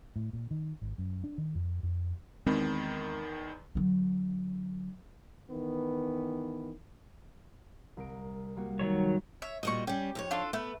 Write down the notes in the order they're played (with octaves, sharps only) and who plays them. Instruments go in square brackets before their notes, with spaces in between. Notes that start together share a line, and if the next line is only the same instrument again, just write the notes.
[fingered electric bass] A2
A#2
D#3
G#1
F#2
D4
D#3
F2
F2
[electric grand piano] E2 D#3 B5 [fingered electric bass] G#3 C4
[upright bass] D3 F#3
[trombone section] D#3 E3 B3
[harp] C2 A#4 D7
G3 A#3 F#4
[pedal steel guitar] D#3 F#3 C#5
[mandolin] C#5 E5
[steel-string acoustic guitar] A#2 G3 F#4 [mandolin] D#5 C#6
[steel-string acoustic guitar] G3 C#4 [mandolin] G4
[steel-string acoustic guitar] F2 D#4 C#5
[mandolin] D4 F4 A4
[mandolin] A3 B4 [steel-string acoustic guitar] B3